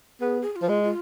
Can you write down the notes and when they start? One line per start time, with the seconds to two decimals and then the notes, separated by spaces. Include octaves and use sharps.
0.21 B3 G#4
0.42 G#4
0.53 G#4
0.56 F4
0.62 F3
0.69 G#3
0.83 F4